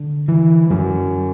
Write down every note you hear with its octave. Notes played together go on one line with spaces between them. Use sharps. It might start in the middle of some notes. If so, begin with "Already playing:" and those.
Already playing: D3
E3
F#2 F#3